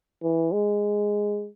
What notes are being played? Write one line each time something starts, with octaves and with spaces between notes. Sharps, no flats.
E3
G#3